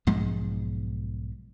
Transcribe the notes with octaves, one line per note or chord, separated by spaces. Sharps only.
B1 G#2 F3 G#3